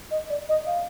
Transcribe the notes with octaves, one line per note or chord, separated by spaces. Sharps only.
D#5
D5
D#5
F5